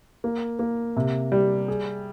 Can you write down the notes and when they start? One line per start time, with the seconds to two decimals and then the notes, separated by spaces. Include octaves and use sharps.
0.24 A#3
0.59 A#3
0.96 C3
1.32 G3
1.68 G#4